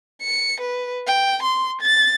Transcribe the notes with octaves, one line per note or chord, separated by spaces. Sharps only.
C#7
B4
G5
C6
A6